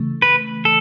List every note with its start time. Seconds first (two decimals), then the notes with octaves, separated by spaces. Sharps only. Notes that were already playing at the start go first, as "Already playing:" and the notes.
Already playing: C#3 E3 A3
0.22 B4
0.65 A4